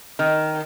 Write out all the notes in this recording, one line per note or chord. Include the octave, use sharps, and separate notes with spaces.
D#3